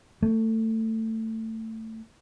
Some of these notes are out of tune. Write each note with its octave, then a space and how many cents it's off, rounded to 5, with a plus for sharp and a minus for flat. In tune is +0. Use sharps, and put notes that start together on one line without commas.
A3 +20